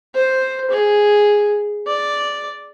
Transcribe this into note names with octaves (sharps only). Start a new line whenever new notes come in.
C5
G#4
D5